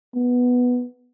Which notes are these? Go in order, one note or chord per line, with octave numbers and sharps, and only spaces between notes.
B3